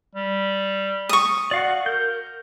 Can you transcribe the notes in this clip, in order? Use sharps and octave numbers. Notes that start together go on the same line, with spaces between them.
G3
C#6 D#6
F#4 D5 F5 F#5
A#4 G6